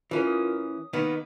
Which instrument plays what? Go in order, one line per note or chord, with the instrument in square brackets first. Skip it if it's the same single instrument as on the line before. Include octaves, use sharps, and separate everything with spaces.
[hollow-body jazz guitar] E3 C#4 [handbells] F4 A#4
[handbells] D#6
[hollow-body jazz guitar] D#3 A#3 B3